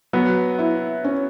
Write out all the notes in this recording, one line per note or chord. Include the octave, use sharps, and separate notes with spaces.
F#3 B3
E4
C#4